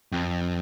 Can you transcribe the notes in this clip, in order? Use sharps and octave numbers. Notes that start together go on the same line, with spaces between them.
F2